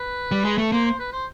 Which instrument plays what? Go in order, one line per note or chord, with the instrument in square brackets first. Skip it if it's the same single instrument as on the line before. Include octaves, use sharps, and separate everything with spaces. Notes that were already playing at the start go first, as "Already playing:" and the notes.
Already playing: [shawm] B4
[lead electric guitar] G3
G#3
A3
[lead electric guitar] A#3 [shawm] C5
[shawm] C5
B4
C5